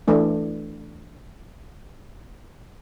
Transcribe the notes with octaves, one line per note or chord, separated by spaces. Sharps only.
E3 A3 D4